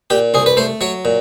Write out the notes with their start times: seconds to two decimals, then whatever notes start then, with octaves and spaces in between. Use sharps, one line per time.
0.10 A#2 G4
0.34 C2 G#4
0.46 B4
0.57 A3 C5
0.81 F#3 C#5
1.05 A#2